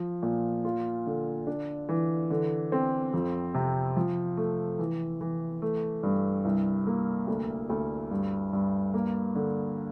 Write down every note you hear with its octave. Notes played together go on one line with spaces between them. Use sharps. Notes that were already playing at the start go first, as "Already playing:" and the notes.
Already playing: F3
A#2
F4
D3
D4
E3
D3
C4
F2
C3
F3
A3
E3
E3
A3
G2
C2
A#3
D2
D2
G2
G2
A#3
D3